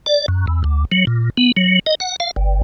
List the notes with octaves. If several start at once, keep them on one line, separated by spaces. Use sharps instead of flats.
D5
F#2
E2
D2
F#3
A#2
B3
F#3
D#5
F#5
F5
G1